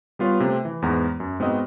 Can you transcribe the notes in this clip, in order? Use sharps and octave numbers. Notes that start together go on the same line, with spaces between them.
G3 B3 F4 B4 C#5
C3 A3 C4
E3
E2 G#2 B3 A#5
F#2
G#2 B3 C4 F#4 D#5